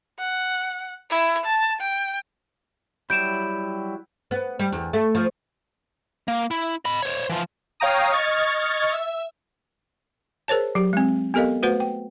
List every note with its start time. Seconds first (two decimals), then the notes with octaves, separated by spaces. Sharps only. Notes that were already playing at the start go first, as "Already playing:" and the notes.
0.19 F#5
1.10 E4
1.46 A5
1.81 G5
3.10 F#3 G3 E4 G6 D7 E7
4.31 B3
4.59 G3
4.72 E2
4.93 A3
5.15 F3
6.28 A#3
6.51 E4
6.85 D#5 B5
7.02 C5 C#5
7.29 E3 F3
7.80 C#5 F5 G5 A#5 D#6
8.12 D#5 C#6 F6 G#6 A6
8.92 E5
10.48 G#4 A#4 C5 C#5 A5
10.75 F#3 G4
10.93 G#3 C4
11.34 B3 G4 A4 A#4 D#5 F5
11.63 A3 F#4 B4 C5 F#5
11.80 G5